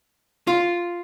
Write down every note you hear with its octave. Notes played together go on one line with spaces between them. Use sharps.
F4